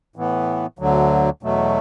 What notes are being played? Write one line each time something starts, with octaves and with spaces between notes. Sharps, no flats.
A2 E3 B3
D2 D3 F#3
E2 B2 F#3 A3